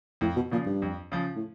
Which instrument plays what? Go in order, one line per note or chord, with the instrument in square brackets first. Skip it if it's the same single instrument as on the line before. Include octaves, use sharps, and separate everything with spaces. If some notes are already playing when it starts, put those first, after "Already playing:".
[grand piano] F2 [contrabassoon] A2
[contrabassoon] B2
[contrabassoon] A#2 [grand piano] C#3 F3
[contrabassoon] G2
[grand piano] F2
C#3 F3
[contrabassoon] A2